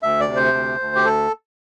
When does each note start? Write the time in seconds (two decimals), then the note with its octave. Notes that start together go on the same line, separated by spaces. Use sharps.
0.03 D2 E5
0.20 D5
0.28 C3
0.36 C5
0.53 D2
0.80 D2
0.96 G4
1.05 A4